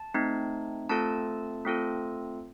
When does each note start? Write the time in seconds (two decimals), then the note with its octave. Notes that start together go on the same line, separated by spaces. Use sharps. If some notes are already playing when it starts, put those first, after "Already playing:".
Already playing: A5
0.14 A3 C4 D#4
0.89 A3 C4 F4 A4 A5
1.65 A3 C4 F4 A4